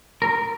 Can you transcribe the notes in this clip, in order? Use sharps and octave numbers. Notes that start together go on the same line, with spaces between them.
A#4